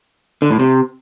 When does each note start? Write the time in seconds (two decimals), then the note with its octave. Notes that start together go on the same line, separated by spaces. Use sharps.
0.42 D3
0.51 A2
0.59 C3